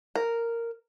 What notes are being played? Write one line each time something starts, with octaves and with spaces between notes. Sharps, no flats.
A#4